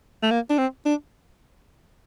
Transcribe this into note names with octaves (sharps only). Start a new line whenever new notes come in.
A3
A#3
D4
C4
D4